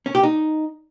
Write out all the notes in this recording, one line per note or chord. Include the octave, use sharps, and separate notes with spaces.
C#4
G4
D#4